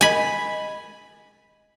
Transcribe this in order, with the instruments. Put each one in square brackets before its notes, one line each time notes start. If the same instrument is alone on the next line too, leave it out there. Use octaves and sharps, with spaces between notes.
[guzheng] G#5 B5